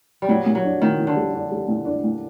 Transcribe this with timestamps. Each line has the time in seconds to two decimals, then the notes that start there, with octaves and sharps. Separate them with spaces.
0.22 G3
0.28 A#2 F#3
0.46 A#2
0.55 F#3
0.64 D4
0.82 A#2 D#3
0.99 A#2
1.07 D3
1.16 G3
1.34 D4
1.52 G3
1.68 A#2
1.85 D4
2.04 A#2